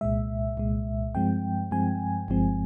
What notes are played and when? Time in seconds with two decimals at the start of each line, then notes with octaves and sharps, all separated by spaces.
0.01 C2 A#2 G#3 E5
0.57 C2 A#2 G#3
1.15 G2 F3 G#3 C4 G5
1.71 G2 F3 G#3 C4 G#5
2.28 G1 G2 F3 G#3 C4